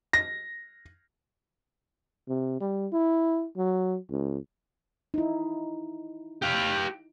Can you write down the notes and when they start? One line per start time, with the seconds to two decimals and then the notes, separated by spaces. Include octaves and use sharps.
0.13 A#6
2.29 C3
2.61 G3
2.93 E4
3.57 F#3
4.10 C#2
5.14 D#4 E4
6.42 G4 F5